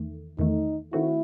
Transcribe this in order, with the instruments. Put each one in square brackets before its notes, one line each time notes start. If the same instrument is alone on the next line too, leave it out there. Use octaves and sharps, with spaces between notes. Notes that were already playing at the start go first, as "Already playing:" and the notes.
Already playing: [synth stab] E2 D#3 A3
[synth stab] E2 D#3 A3 [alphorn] D#4
[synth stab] D#3 A3 C4 F#4 [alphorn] E4